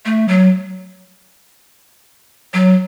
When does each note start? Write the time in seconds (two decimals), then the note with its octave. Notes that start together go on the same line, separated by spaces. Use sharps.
0.05 A3
0.28 F#3
2.54 F#3